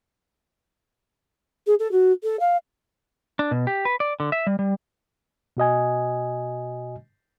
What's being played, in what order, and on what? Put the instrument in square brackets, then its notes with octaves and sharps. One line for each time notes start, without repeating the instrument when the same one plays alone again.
[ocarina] G#4
A4
F#4
A4
F5
[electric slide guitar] D4
B2
G4
B4
D5
D3
E5
G3
G3
[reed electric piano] B2 F#4 D#5 G#5